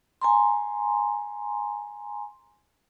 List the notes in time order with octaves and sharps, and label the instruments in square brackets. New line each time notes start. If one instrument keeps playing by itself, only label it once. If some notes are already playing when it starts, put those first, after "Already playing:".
[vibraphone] G#5 A#5 C6